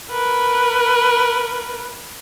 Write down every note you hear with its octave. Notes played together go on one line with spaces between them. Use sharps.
A#4 B4